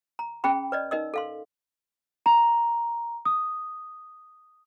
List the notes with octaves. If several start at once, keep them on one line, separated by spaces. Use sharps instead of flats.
A#5
C#4 G#4 G5 B5
B4 D5 D#5
D#4 A#4 D#5 E6
A4 F5 C6
A#5
D#6